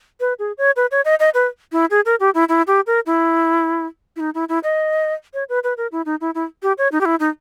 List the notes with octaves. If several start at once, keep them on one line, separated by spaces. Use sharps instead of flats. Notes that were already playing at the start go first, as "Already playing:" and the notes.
B4
G#4
C#5
B4
C#5
D#5
D#5
B4
E4
G#4
A#4
G4
E4
E4
G4
A#4
E4
E4
D#4
E4
E4
D#5
C#5
B4
B4
A#4
E4
D#4
E4
E4
G4
C#5
D#4
G4
E4
D#4